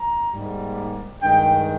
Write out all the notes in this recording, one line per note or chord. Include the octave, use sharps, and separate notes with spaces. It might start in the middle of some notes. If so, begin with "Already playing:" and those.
Already playing: A#5
G#2 G3 A#3
G2 D#3 G#3 G5